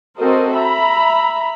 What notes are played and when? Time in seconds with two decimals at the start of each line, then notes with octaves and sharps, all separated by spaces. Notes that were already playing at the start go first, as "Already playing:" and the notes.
0.18 C4 F#4 A4 A#4 C5 D#5
0.55 E5 A#5 B5